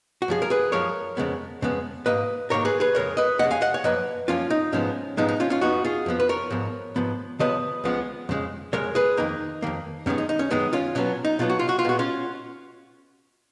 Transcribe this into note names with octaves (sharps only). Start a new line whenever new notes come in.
F#4
F#2 F3 G#3 G#4
A#4
G#4 B4
F#2 F3 G#3 A#4 C#5
F2 C#3 G#3 B3
F2 C#3 G#3 B3
G#2 D#3 A#3 B4 D#5
G#2 D#3 A#3 A#4 C#5
G#4 B4
G#4 B4
F2 C#3 G#3 A#4 C#5
B4 D#5
F2 C#3 G#3 D#5 F#5
F5 G#5
D#5 F#5
C#5
F#2 F3 A#3 B4 D#5
F#2 F3 A#3 C#4 F4
D#4
G#2 F3 G#3 B3 C#4
G#2 F3 G#3 B3 D#4
D#4
C#4 F4
C#4 F4
F2 F3 B3 D#4 F#4
F4 G#4
F2 F3 B3
B4
A#4 C#5
G#2 F3 B3
G#2 F3 B3
C#2 C#3 F3 B3 B4 D#5
C#2 C#3 F3 G#3 B3
F2 C#3 G#3
F2 C#3 G#3 A#4 C#5
G#4 B4
F2 D#3 A#3 D#4
F2 D#3 A#3
F#2 D#3 G#3 B3 C#4
D#4
D#4
C#4
F#2 D#3 G#3 B3 D#4
C#4 F4
B2 F#3 B3 C#4
D#4
B2 F#3 B3 F4
F#4
F4
F#4
F4
A#2 G#3 B3 F#4
C#4 F4